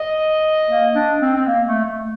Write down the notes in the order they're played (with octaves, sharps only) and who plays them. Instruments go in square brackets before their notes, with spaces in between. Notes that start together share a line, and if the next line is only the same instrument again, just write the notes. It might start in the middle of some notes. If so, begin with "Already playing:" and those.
Already playing: [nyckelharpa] D#5
[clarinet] A#3
D4
C4
C4
A#3
A3
A3